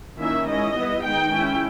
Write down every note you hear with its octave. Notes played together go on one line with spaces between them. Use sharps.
D#3 A#3 C#4 E4 E5
G#3 C#4 E4 D#5
G3 B3 E4
D#3 G#3 D#4 G5
G#3 C#4 E4